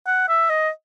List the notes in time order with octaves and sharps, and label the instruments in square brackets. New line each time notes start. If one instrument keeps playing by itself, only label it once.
[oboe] F#5
E5
D#5